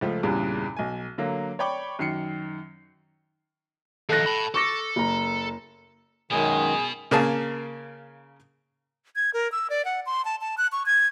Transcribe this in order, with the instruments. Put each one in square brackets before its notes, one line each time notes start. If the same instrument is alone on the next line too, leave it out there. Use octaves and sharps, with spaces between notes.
[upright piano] C#2 F3 A3
E2 G2 A#2 C#3
B1 G#5
D3 F#3 A#3
C#5 D5 G5 B5 C#6 D6
F#2 D#3 C7 C#7
[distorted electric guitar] D#3 F3 [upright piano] A4 F#6 A#6
[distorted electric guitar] A5 B5
[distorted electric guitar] A4 [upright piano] C#6 D6 A#6
[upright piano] F#1 A#5
[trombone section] F#2 G#3 [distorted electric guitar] B2 [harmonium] D#3 [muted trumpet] G#4
[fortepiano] C#3 A#3 G#4 A5
[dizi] G#6
A#4
E6
D5
F#5
C6
A5
A5
F#6
C#6
G#6